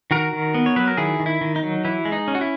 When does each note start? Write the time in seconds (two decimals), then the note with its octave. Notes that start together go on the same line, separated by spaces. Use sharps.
0.11 D#3 F#4 A#4
0.33 D#3
0.54 B3
0.66 C#5
0.76 F#3 B4
0.87 A#4
0.97 D#3 E4 G#4
1.20 D#3
1.26 E4
1.41 D#3
1.56 D#4
1.63 F#3
1.85 E3 E4
2.05 G#3
2.12 D#4
2.28 C#4
2.35 F#4
2.41 E4